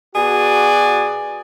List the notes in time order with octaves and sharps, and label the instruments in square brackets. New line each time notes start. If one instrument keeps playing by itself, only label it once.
[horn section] B2 F#4 G#4 D5